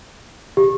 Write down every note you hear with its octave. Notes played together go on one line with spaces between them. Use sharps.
G4